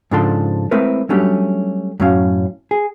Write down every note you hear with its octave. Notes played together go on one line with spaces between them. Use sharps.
G#2 C#3 F3 D4 A4 C6
G#3 A3 C4 E4 A#4 B4
F#3 G3 A3 C#4 D4 G4
F#2 A2 F#3 C#4 F5
G#4